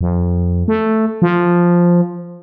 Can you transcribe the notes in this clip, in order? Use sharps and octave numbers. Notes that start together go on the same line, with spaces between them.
F2
A3
F3